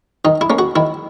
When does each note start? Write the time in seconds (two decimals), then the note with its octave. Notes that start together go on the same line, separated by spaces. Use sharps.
0.25 D#3 D#4
0.41 E4
0.50 A#3 C#4
0.59 F#4
0.76 D#3 E4